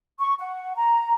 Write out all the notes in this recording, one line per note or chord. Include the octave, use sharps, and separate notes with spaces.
C#6
F#5
A#5